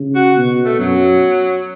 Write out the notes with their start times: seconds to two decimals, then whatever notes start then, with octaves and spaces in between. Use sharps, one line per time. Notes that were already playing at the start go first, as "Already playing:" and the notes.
Already playing: C#3
0.15 F#4
0.37 B2
0.65 A3
0.79 F#2 F#3